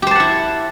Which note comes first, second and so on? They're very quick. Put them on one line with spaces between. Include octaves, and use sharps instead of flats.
G4 C5 A5 F#5 E4